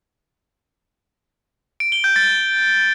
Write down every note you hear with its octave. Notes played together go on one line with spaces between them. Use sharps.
D7
G7
G6
A6